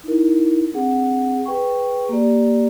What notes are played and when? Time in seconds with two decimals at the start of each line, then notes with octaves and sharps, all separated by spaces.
0.04 D#4 E4 A#4
0.73 C4 D4 G#4 F#5
1.46 G#4 B4 G5 C#6
2.09 A#3 G4 D5